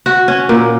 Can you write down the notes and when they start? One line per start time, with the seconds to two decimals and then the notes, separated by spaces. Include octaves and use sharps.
0.06 F#4
0.28 C#4
0.49 A#2